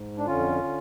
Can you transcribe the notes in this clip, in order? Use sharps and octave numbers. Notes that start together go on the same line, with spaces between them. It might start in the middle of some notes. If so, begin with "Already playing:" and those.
Already playing: G#2
D4
F2 D3 C#4 F4
D3